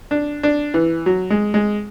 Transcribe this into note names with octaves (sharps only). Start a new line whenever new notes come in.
D4
D4
E3
F#3
G#3
G#3